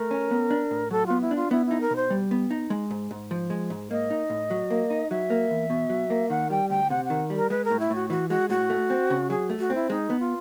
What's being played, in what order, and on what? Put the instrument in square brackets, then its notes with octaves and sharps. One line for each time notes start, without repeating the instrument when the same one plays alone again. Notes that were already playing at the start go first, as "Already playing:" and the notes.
Already playing: [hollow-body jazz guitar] A3 [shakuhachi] A#4
[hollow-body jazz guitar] C#4
B3
D4
A2
[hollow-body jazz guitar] F#3 [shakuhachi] A4
[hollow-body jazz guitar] B3 [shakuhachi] F4
[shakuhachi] E4
[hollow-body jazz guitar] D4 [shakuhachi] F4
[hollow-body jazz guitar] B3 [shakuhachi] E4
[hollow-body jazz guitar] D#4 [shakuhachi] E4
[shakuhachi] A#4
[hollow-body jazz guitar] B2
[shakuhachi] C5
[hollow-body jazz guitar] G3
B3
D#4
G#3
G#2
G#2
F3
G#3
G#2
[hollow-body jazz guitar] A#3 [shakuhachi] D#5
[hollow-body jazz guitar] D#4
A2
F#3
A#3
D#4
[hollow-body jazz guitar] F#3 [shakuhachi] E5
[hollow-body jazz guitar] A#3
E2
B2
F#3
A#3
[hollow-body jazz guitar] D#3 [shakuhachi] F#5
[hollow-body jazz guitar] G3 [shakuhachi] G5
[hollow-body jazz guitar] D2 [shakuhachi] G5
[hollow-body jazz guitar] C3 [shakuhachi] F#5
[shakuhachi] F#5
[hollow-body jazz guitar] D#3
G3
[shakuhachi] A#4
[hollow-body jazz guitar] G#3 [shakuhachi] B4
[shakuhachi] A#4
[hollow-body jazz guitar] A2
[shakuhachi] E4
[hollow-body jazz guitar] A2 [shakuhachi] F#4
[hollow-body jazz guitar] E3 [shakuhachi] F#4
[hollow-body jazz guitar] G#3 [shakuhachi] F#4
[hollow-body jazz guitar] A2 [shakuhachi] F#4
[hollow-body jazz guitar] A3
C4
C#3
[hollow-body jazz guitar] F#3 [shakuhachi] G#4
[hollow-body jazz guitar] A3
[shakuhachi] F#4
[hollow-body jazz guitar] C4 [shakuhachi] E4
[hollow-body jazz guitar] G#3 [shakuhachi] D#4
[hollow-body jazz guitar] B3
[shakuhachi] F4